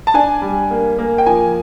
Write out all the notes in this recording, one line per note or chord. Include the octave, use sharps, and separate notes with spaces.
A5
D4 G#5
G3
A#3
A#3
G5
F3 G#5